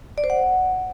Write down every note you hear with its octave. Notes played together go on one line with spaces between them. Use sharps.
D5
C5
F#5